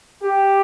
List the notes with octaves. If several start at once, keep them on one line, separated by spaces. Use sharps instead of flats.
G4